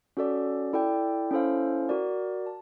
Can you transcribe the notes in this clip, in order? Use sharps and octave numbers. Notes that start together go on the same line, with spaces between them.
C#4 F#4 A4 D5
E4 A4 D5 G5
C#4 E4 A4 C5 F5
F#4 A#4 D5
A5